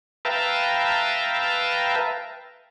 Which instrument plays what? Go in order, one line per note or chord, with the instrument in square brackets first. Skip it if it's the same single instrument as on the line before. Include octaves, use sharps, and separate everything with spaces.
[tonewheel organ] B4 E5 F5 G5 A5 A#5